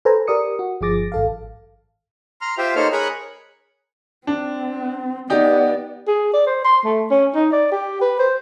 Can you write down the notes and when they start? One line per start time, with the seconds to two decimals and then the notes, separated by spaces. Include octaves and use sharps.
0.05 A4 B4 C5 G#5 A#5
0.27 G4 A#4 D5 D#6 C#7
0.59 F#4
0.81 G1 F3 G#4 D6 A6 A#6
1.12 G#1 A4 F5
2.41 A#5 C6 F6
2.58 F4 G4 C5 E5 G5
2.76 A#3 D#4 A4 C5 C#5 F6
2.92 G#4 A#4 C#5 B5 C#6 F#6
4.27 C4 D4
5.30 B3 D#4 G4 D5
6.07 G#4
6.34 D5
6.46 C5
6.65 C6
6.85 A3
7.11 C#4
7.35 D#4
7.52 D5
7.72 G4
8.01 B4
8.19 C5